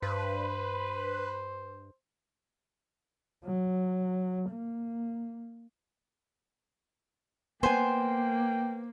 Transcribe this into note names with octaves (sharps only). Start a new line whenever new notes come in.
G2 B4 C5
F#3
A#3
A#3 B3 C5 G5 G#5